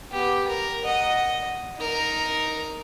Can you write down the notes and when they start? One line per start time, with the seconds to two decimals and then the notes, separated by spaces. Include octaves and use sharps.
0.12 B3 G4
0.48 A#4
0.85 D#5 F#5
1.78 D#4 A#4